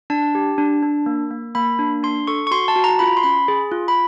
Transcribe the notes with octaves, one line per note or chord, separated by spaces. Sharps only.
D4 A5
G4
D4
D4
A#3
A#3
A#3 B5
D4
D4 C6
A4 C#6
C#6
F#4 C6
A5
F#4
A#5
F4 B5
C6
C#4 B5
G#4
F4
B5